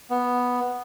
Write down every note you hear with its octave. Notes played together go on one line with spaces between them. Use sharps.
B3